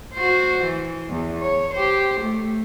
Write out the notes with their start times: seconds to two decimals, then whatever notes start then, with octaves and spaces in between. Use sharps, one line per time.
0.14 F#4 C5
0.64 E3
1.10 E2
1.42 C#5
1.74 G4 C5
2.21 A3